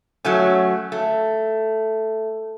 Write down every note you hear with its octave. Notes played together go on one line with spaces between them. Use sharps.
F#3 A3 C#4
A3